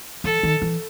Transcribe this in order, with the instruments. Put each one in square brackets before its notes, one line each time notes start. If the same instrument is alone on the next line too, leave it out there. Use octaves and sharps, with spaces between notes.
[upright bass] E3 [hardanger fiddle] A4
[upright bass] D#3
E3